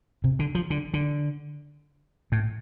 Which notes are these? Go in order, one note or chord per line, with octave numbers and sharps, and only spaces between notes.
C3
D3
F3
D3
D3
A2